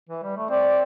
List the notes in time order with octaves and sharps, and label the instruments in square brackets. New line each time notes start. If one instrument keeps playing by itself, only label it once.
[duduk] E3
G3
A3
[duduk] C4 [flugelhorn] D5